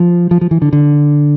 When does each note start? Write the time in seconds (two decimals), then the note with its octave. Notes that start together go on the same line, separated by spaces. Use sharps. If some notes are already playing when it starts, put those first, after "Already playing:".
Already playing: F3
0.31 F3
0.41 F3
0.51 E3
0.62 D3
0.73 D3